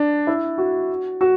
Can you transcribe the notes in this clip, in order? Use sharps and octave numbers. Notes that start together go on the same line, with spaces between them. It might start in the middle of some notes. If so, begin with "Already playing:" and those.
Already playing: D4
E4
F#4
F#4